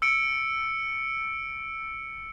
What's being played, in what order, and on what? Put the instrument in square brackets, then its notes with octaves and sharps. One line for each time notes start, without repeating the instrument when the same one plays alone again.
[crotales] E6 C#7 D7